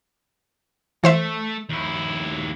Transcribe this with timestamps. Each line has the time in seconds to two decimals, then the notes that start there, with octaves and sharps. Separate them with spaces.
1.04 E3 A3 A4 C5 E5
1.69 D#2 E4